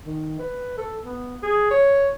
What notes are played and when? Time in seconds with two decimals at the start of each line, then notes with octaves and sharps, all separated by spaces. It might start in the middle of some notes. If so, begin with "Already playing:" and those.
0.06 D#3
0.39 B4
0.77 A4
1.04 B3
1.43 G#4
1.70 C#5